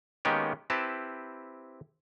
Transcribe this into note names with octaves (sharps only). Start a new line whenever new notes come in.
D#3 G#3 A#3 B3 C#4 G4
C4 E4 G4 B4 A5